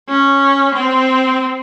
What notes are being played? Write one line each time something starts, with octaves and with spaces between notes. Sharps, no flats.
C#4
C4